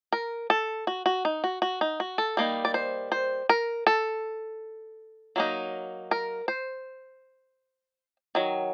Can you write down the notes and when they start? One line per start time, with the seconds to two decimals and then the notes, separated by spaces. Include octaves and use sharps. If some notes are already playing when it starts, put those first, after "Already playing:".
0.12 A#4
0.50 A4
0.87 F#4
1.06 F#4
1.25 D#4
1.44 F#4
1.62 F#4
1.81 D#4
2.00 F#4
2.18 A4
2.37 G3 A#3 D#4
2.65 D5
2.74 C5
3.12 C5
3.49 A#4
3.87 A4
5.36 F#3 A#3 D#4
6.11 A#4
6.48 C5
8.35 D#3 F#3